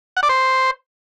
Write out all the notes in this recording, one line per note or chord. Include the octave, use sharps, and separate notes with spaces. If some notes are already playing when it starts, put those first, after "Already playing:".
F#5
D5
C5